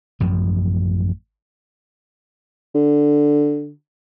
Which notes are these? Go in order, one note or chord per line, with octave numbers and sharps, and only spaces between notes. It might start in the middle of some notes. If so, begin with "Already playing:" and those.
A1 F#2 F3
D3